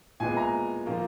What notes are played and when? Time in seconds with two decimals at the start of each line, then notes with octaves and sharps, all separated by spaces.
0.20 A#2 G#3 B3 G#5
0.37 A#5
0.86 A#2 F3 A#3